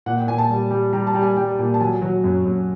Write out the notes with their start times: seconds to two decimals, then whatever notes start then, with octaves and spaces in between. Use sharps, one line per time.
0.06 A#2 F#5
0.17 G5
0.27 A#2 G#5
0.38 A5
0.50 G3
0.71 G3
0.93 G3 A#5
1.07 A5
1.14 G3
1.22 G#5
1.37 G3 G5
1.59 A#2
1.74 A5
1.81 F#3 G#5
2.02 F#3
2.24 F#2
2.45 F#2